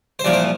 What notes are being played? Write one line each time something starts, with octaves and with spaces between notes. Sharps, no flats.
C5
C2 A#2 F3 D5
C5